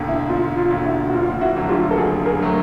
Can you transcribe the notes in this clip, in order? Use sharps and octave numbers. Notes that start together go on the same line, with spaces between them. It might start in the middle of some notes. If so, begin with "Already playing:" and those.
Already playing: E1 D#2 D3
E4
E1 F4
F4
D#2 D3
E4 F#4
F#4
F#1 F4
E4 F#4
F2 D3 F#3 A3
F4 G4
A4
F#1 F#4 G#4
G#4 A#4
D3 F#3 A3